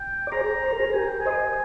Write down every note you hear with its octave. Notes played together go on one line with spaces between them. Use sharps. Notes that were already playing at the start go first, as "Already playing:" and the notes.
Already playing: G5
D5
G#4 C5 A#5
C5
A#4
G#4 C5 A#5
G4 A#4 G#5
G5
G#5
C5 D#5